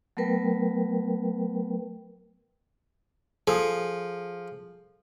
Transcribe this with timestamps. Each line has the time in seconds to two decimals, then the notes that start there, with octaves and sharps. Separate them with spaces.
0.17 F#3 A3 B3 A#4 B4 G5
3.47 F3 G#4 A4 D#6